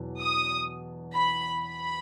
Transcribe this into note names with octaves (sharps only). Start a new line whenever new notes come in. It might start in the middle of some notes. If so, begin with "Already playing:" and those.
Already playing: E2 B2 F#3
D#6
B5
B5